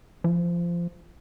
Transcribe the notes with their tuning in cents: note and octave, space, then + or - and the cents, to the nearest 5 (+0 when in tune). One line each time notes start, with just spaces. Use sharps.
F3 -20